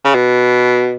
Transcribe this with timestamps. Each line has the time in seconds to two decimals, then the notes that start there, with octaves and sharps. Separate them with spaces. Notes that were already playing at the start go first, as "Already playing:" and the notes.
0.04 C#3
0.15 B2